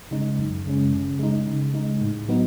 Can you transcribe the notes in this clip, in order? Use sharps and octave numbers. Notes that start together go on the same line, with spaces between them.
C#3 G#3 D#4
F#2
C#3 G#3 C#4
C#3
G#3 D#4
C#3
G#3 D#4
A2
F#3 B3 D#4